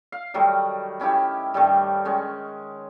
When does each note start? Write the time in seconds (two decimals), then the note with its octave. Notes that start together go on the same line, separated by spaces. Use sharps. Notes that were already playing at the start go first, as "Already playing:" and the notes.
0.12 F5
0.34 D#3 F#3 G3 A3
1.00 D#3 C#4 E4 G4
1.54 G2 D#3 G3 A3
2.05 D#3 G#3 C#4